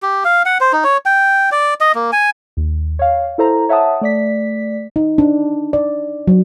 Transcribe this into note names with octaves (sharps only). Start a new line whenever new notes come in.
G4
F5
F#5
C5
D#4
C#5
G5
D5
D#5
A#3
G#5
D#2
C#5 F5
E4 A4 C5 A#5
C#5 E5 F#5 A5 D#6
A3 D5 B6
D#4
D4
D5
F#3